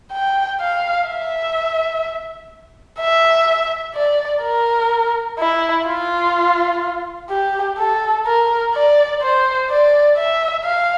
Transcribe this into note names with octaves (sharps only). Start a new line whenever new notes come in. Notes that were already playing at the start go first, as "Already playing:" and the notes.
G5
F5
E5
E5
D5
A#4
E4
F4
G4
A4
A#4
D5
C5
D5
E5
F5